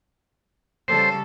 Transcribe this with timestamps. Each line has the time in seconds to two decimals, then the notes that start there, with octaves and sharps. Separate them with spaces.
0.88 C#3 G3 A4 C5